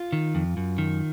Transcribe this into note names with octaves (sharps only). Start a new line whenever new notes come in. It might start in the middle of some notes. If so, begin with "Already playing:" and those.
Already playing: F4
D#3
F2
F#2
D#3